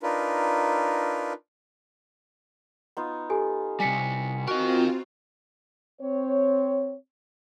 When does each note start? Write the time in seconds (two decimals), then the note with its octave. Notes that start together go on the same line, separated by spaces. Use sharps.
0.03 D4 D#4 F4 A#4 B4
2.97 B3 D#4 F4
3.30 G4 A4 G#5
3.80 C3 G3 G#5 B6 C#7
4.47 C4 F4 F#4 A#4 D#5
6.02 C4 C#5